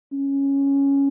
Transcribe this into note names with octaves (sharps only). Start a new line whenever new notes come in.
C#4